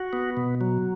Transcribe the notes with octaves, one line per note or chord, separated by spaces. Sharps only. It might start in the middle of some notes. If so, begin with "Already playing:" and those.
Already playing: F#4
B3
B2
F#3